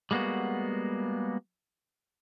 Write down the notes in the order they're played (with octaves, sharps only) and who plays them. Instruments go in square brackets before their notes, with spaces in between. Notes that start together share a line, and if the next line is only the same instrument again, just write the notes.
[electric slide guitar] G3 G#3 A#3 B3 F#4